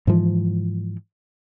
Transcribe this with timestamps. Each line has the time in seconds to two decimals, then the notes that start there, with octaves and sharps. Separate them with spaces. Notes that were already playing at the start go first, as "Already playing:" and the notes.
0.07 G#2 E3 F3